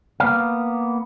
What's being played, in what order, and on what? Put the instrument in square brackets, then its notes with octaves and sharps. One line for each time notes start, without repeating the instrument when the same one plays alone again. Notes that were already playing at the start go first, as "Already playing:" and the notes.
[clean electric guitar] A#3 B3 F5